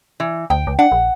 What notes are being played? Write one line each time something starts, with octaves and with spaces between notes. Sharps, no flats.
E3
D2 G5
C#2
D4 F#5
A#1